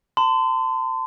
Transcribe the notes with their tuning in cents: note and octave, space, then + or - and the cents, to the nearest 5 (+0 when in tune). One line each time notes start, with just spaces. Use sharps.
A5 +35 C6 -35